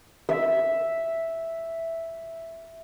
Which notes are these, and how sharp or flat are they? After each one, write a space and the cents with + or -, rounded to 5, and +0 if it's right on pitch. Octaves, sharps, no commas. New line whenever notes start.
E5 +0